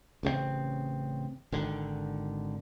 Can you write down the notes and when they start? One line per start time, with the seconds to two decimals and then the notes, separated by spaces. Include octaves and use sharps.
0.23 A1 C#3 E3 C4
1.52 G#1 D3 D#3